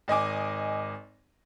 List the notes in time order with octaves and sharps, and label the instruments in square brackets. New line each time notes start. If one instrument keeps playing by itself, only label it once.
[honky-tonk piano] G#1 D#5 G#5 D6